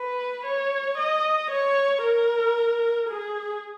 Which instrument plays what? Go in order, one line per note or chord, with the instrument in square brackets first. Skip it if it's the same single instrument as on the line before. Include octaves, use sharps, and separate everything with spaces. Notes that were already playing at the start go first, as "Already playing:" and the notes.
Already playing: [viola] B4
C#5
D#5
C#5
A#4
G#4